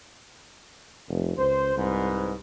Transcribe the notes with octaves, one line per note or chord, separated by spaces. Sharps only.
F1
C#2 C5
C2 G#2 B4